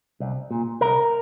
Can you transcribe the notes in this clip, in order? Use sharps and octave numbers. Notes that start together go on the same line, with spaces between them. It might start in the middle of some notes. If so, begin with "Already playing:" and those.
C2
A#2
C2 A#4